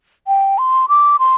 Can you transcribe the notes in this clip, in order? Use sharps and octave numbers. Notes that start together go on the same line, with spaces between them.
G5
C6
D6
C6